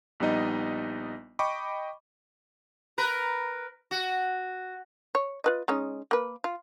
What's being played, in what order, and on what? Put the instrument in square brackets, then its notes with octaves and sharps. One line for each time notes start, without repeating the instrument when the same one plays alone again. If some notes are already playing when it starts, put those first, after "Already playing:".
[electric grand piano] A#1 G3 B3 D#4 D#5
D#5 G5 B5 C#6 D6
[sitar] A#4 B4
F#4
[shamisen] C#5
F4 B4 D#5
G#3 C#4 D#4
A#3 B4
F4